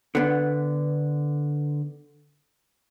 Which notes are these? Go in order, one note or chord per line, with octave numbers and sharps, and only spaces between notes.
D3 B3